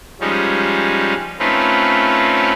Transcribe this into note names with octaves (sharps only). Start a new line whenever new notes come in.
F3 G3 G#3 C#4 D#4
A3 C4 C#4 D#4 F4 B4